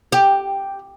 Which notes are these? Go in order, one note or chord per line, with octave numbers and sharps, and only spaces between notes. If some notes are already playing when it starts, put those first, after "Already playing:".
G4